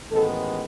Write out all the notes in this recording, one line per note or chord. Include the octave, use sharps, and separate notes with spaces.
A1 G#2 D#3 G#3 B3 A4